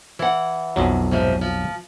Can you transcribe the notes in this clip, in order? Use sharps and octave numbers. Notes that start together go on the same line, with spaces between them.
E3 F#5
B1 F2 F#3
G#2 C3 F3
F3